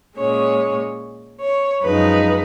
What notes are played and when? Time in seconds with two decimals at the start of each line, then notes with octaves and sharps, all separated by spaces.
0.17 A#2 G#3 C#4 C#5
1.42 C#5
1.83 F#2 F3 G#3 D#4 B4